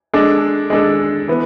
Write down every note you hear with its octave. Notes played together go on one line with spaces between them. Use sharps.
G#3 D4 A4
G#3 D4 A4
E3 B3